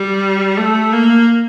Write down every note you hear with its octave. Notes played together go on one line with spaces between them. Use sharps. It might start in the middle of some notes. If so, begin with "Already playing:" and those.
Already playing: G3
A3
A#3